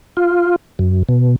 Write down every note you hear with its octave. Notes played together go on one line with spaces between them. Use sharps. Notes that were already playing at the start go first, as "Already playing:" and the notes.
F4
F#2
B2